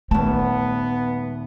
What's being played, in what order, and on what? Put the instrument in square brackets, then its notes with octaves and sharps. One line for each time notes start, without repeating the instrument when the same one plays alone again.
[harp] D#1 A5 [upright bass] A3 [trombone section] B3